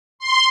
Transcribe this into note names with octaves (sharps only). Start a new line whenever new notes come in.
C6